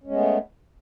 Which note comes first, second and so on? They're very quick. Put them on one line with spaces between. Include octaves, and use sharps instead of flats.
C#4 G#3 B3 A3